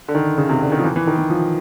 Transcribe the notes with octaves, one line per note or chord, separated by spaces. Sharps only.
D3
D#3
C#3
C3
D3
D#3
F3
E3
E3
D#3
E3
F3